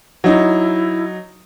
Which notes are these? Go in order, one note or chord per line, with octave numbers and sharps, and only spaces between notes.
F#3 D#4 E4